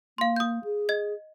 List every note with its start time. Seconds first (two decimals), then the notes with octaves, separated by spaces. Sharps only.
0.18 A#3 F5 C6
0.36 D#6 G6
0.64 G#4
0.89 D#5 G#6